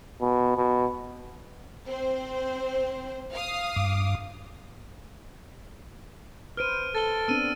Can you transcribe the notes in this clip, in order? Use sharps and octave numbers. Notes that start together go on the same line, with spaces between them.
B2
B2
C4 C5
F5 D#6
G2 D6
B4 C5 F6 D7 D#7
A4 A6 G7
B3 C4 D4 E6 D#7